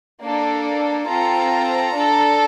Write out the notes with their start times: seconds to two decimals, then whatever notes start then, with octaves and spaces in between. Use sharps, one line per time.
0.22 A#3 D4 A4
1.08 C4 F4 A4 A#5
1.95 D4 A4